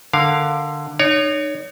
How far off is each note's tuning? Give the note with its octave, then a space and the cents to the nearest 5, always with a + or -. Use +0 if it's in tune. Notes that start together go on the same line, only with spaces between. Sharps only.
D3 +10 A#4 +0 F5 +0
D#4 -35 C#5 +15